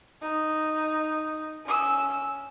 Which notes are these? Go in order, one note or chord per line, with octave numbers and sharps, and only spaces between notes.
D#4
C#4 E6